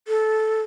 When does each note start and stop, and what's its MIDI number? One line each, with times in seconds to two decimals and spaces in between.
0.08 0.62 69